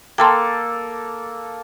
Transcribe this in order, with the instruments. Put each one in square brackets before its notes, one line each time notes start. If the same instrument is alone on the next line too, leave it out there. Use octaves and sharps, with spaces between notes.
[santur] A#3 A4 [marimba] G5 A5 C6